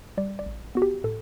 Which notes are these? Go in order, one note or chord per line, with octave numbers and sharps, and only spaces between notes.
G3 D5
D5
A1
B3 F#4
G4
A2 A4